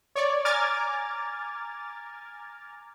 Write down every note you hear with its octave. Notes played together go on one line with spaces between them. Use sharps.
C#5 D5
G#5 A#5 D6 F6 G#6 A6